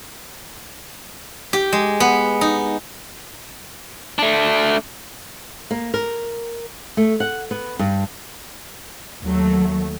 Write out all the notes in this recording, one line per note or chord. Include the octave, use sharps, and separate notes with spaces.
G4
G#3
B3
D#4
A3 D4
A#3
A#4
A3
F#5
B3
G2
D#2 F#3 A3